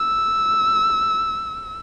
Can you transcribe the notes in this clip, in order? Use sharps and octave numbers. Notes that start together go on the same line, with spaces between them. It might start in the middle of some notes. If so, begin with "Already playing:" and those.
Already playing: E6